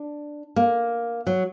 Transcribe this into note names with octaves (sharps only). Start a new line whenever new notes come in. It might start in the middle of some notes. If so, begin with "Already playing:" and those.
Already playing: D4
A#3
F#3